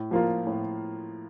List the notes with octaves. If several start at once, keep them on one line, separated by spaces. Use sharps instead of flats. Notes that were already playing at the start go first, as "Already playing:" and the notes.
Already playing: A2
F3 A#3 F4
A2